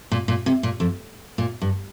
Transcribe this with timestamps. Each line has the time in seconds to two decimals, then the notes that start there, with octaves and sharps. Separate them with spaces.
0.12 A#2
0.28 A#2
0.46 C3
0.63 A#2
0.80 F2
1.38 A#2
1.62 G2